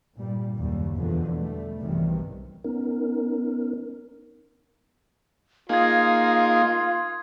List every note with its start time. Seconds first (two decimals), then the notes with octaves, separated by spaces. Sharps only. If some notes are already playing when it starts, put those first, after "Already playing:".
0.18 G2 A#2 G3
0.58 F#1 D#2 G3
0.96 E2 B2 D3 F3 F#3
1.36 G3 A3
1.80 B1 G2 C3 D#3 E3 G3
2.64 B3 C#4 D#4 A#4
5.69 A#3 D#4 F4 G#4 F5 D#6 G#6